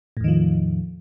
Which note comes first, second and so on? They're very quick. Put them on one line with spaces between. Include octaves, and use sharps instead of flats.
A2 E2 D#3 F3